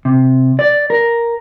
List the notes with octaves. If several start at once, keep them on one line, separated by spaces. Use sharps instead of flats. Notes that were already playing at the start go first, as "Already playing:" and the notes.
C3
D5
A#4